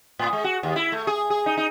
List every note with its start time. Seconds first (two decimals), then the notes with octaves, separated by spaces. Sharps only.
0.19 A2
0.33 G#3
0.44 F#4
0.63 D#2
0.76 E4
0.92 A3
1.07 G#4
1.30 G#4
1.46 D#4
1.57 D#4